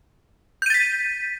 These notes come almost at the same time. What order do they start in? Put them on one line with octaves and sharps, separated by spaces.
G6 D#7 A6 B6